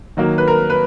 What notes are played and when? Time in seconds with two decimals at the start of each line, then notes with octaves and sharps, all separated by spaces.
0.17 D#3 F#3 A#3
0.38 B4
0.48 A#4
0.70 B4